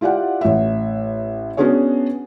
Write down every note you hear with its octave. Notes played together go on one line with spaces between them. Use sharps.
E4 F4 G4 D5 F#5
A1 E5
B3 C#4 D4 F#4 G#4 C#5